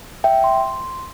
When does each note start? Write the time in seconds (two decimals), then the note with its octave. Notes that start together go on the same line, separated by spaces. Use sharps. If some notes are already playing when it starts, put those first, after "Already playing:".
0.24 E5 G5
0.44 C6